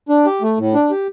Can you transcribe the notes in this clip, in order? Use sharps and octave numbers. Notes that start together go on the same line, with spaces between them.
D4
G4
A3
A2
D4
G4